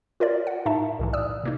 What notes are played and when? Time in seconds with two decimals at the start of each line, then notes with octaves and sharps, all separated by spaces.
0.20 F4 A#4 C#5 D5
0.47 F#5
0.66 A2 D#4 E5 A5 A#5
0.99 C2 A2 E3
1.13 D5 D#6 E6
1.43 C3 A#3 D#4